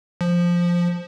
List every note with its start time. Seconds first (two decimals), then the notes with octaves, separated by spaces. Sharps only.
0.21 F3